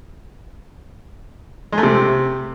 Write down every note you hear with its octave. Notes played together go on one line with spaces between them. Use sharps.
G#3
A3
C3